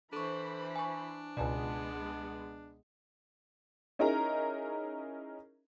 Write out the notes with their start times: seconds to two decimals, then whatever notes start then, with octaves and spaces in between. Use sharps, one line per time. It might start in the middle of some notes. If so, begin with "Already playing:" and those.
0.13 E3 D4 A4 C5 B5 C#6
0.76 G#5 C#6
1.37 C#2 B2 G#3 B3 D5 G#5 A5
3.99 C#4 D#4 E4 G#4 A#4 A#5